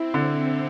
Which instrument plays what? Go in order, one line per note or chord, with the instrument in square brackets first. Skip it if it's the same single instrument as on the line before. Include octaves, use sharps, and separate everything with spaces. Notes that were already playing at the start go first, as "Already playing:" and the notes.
Already playing: [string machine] C4 [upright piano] E4
[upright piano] D3